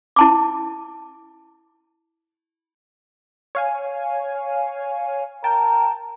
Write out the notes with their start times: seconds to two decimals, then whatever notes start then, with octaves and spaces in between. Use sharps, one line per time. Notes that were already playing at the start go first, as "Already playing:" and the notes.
0.16 E4 A5 D6
3.55 C#5 F5 G#5
5.44 A#4 G5 A5